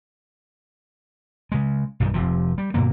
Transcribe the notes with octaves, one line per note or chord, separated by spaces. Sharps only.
C#3 G#3
B1 G2 D#3
F1 C3 F3
G3
G2 B2 D3 A#3